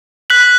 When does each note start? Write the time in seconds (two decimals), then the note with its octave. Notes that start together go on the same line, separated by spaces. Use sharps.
0.30 F#6 B6 F#7